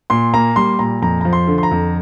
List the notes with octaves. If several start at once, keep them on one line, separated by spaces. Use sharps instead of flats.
A#2 C6
A#3 A#5
G3 C6
A#2 A#5
F2 A#5
F3 A#5
C6
D3
C6
A#5
F2